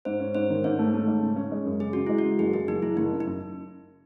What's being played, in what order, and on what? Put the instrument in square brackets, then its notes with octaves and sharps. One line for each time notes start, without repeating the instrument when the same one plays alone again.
[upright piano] G#2 [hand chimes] C5
[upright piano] C#4
[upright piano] G#2 [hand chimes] C5
[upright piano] D#3
[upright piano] G#2 [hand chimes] C#5
[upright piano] A3
A3
G#2
C#3
C#4
G#3
F#2
[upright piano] C#3 [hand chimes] G#4
[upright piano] C#3 [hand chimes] F#4
[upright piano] G#3 [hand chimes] E4
[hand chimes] F#4
[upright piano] C#3
[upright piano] F#1 [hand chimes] G#4
[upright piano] F#2 [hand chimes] G#4
[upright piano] F#1 [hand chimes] D#4
[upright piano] F#1 [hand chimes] E4
[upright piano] F#1 [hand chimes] D#4
[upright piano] C#3
[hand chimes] D#4
[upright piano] F#2